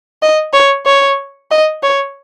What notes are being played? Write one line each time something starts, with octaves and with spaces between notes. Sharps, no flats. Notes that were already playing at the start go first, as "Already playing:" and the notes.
D#5
C#5
C#5
D#5
C#5